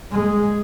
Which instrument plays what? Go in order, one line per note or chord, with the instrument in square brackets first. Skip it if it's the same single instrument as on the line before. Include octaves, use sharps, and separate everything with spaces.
[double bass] G#3